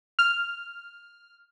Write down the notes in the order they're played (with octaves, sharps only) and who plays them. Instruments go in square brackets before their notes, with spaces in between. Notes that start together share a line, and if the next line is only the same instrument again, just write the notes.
[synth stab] F6